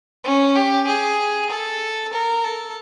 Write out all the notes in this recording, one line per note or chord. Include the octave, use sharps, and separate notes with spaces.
C#4
G4
G#4
A4
A#4
A4